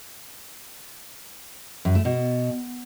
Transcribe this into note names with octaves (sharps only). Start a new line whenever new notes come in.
F#2
A3
B2